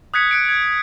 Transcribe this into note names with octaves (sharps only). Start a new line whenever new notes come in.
D#6 F#6 G#6 B6 C#7
F#6 C#7 D7
G#6